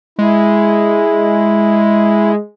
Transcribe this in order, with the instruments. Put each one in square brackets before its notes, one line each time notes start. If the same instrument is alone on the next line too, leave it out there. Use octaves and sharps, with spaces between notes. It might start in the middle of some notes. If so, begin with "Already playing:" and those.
[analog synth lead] G#3 [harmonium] E4